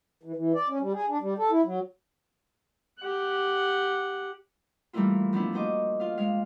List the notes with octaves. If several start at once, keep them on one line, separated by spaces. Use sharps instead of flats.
E3
E3
D5
C#4
G3
G#4
D4
G3
A4
E4
F#3
G4 F#5
E3 G3 A3 A#3 E4 F4
F3 B3 D4 E4
A#3 F#4 C5 D#5 D6
F4 F5
G#3 F5